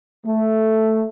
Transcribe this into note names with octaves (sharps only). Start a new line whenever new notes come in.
A3